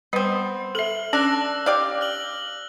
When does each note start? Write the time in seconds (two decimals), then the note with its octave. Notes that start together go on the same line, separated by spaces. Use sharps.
0.13 G3 B3 C4
0.75 A4 E5 F6 F#7
1.13 C#4 D4 E6 F#6 A#6
1.66 G4 D5 F5
2.01 F6 F#7